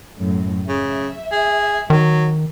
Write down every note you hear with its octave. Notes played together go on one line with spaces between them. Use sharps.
F#2 A2
C#3 E5
G#4
D#3 F#3